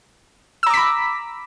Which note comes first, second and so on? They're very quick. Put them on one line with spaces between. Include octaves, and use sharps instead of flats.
E6 A#5 D6 B6 B5